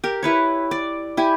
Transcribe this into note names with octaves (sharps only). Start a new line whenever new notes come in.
G4 A#4
E4 B4 C#5
D5
E4 G4 G#5